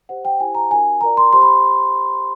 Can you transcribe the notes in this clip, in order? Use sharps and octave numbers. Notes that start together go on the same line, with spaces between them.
G4 C5 F#5
G5
E4 G4 C5 G#5
A#5
D4 F#4 A#4 G#5
F4 A#4 D5 A#5
C6
G4 C5 C6
B5